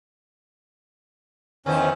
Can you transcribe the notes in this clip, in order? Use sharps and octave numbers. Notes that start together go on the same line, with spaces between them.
E2 D#3 F3 C#4 C5